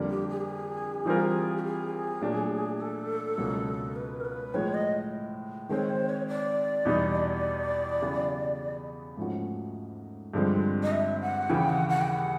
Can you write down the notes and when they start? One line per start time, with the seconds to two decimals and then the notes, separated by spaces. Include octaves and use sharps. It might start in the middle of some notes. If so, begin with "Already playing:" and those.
Already playing: F2 D3 G3 A#3 D4
0.09 G4
0.28 G#4
1.05 E3 G3 C4 F4 A#4
1.57 G4
1.64 G#4
2.21 A#2 F#3 A3 D4
2.80 A4
3.37 C#2 B2 F#3 A#3 C#4
3.95 B4
4.20 A#4
4.24 B4
4.54 A2 F3 G#3 C#5
4.73 D#5
5.69 D#3 G#3 C4 C#5
5.89 C5
6.09 C#5
6.27 D5
6.85 E2 B2 G3 B3 D#4
8.01 C#3 F#3 B3 E4 G4
9.17 G#2 F3 A3 C#4 F#4
10.34 G2 D3 F3 G#3 C4
10.82 D#5
10.91 E5
11.20 F#5
11.49 D#2 C#3 E3 G5
11.69 F#5
11.88 F#5
12.01 G5
12.07 F#5